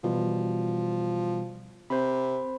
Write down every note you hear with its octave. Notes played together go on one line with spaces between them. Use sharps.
B2 E3 F3 G3
C3 C5 B5